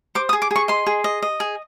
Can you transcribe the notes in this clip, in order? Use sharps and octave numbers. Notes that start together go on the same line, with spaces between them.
C5 D6
D#6
G#4
D6
G#4 C#6
D#5 C6
G#4
D#5
D#5
G#4